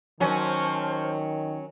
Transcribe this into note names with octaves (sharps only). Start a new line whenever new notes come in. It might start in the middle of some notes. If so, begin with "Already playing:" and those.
D#3 F#3 C#4 C5 A5 F6